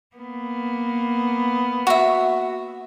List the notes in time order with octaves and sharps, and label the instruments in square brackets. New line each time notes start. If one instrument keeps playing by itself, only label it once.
[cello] A#3 B3
[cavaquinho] F#4 E5